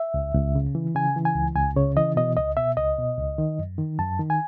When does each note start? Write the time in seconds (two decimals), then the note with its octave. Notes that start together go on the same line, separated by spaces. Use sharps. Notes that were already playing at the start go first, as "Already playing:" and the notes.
Already playing: E5
0.14 C#2
0.35 C#2
0.55 C#3
0.75 E3
0.95 C#3 G#5
1.16 E3
1.25 G#5
1.35 C#2
1.55 C#2 G#5
1.76 C#3 C#5
1.96 E3 D#5
2.17 B2 D#5
2.37 C#2 D#5
2.57 B2 E5
2.77 C#2 D#5
2.98 B2
3.18 C#2
3.38 D#3
3.59 F#2
3.78 D#3
3.99 F#2 A5
4.19 D#3
4.30 G#5